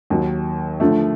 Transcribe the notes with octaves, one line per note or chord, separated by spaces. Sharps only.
D#2 D#3 F#3
D3 F3 A3